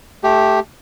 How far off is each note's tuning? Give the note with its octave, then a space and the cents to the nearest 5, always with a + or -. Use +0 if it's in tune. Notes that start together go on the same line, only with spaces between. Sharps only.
A3 -15 G4 +0